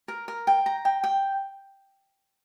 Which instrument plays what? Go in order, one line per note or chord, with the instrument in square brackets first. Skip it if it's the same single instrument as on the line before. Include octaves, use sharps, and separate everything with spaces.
[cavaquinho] A#4
A#4
G5
A#5
G5
G5